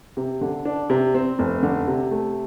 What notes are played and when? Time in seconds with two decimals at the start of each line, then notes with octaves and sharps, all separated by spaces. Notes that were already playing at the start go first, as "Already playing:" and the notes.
0.17 C3
0.41 D3
0.65 D4
0.90 C3
1.14 C4
1.39 F1
1.63 D3
1.87 C3
2.11 A3